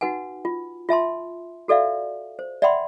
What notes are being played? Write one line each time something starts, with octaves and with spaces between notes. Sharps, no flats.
D#4 F#4 B4 F#5 G#5
F4
F4 E5 A5 C6
F#4 A4 D5 E5 F5
C5
D5 E5 F#5 G5 B5 C6